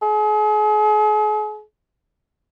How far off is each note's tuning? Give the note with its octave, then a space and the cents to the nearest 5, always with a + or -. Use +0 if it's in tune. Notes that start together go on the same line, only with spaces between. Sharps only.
G#4 +40